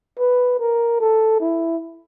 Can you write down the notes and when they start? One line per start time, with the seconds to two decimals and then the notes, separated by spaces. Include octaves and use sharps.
0.19 B4
0.60 A#4
1.00 A4
1.41 E4